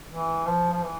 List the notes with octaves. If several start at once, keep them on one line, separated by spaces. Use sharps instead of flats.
E3
F3
F3
E3